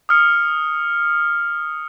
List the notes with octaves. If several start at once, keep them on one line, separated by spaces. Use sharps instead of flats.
D#6 F6 C#7